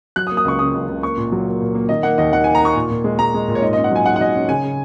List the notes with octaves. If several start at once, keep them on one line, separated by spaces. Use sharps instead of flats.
F#3 F#6
D#6
A#3
D#6
C#2 C#6
C#3 D#6
C#2
C#2
A#3 C#6
A#2
F#3
A#3
A#2
A#3
D#3 D#5
A#3 F#5
D#2 D#5
D#3 F#5
A#3 G#5
A#5
A#3 C#6
A#2
A#2
G#3
G#3 A#5
G#3
A#2
C#5
G#2 D#5
C#4 D#5
F#5
F#3 G#5
G#2 F#5
F#5
F#3 D#5
C#4
C#3 G#5
C#3